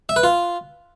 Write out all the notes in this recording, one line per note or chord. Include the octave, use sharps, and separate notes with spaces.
E5
B4
F4